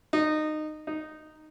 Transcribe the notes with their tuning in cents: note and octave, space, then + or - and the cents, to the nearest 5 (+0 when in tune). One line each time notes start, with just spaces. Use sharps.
D#4 -20
D#4 -10